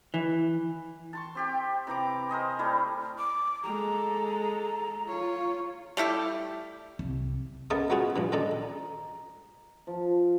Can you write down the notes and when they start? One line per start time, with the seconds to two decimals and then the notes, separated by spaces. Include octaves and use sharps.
0.14 E3
1.13 A5 C6 C#6
1.35 C4 G4 G5
1.87 C3 E3 A#5 D6
2.29 A#4 C5 D#5 G#5
2.59 G3 A3 E4
3.18 D6
3.63 G#3 A4 A#5
5.05 F4 C#5
5.97 G3 A3 E4 G4
6.99 C2
7.70 C#3 A3 B3 A#4 D#5 A5
7.90 F#3 G#3 B3 F4 F#4 G#4
8.16 A#1 G2 E3
8.32 D#3 G#3 D4 D#4 A4
8.62 A#5
9.87 F3